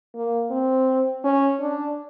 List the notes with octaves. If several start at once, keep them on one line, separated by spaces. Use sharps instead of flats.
A#3
C4
C#4
D4